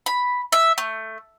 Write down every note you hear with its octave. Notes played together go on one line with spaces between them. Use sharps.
B5
E5
A3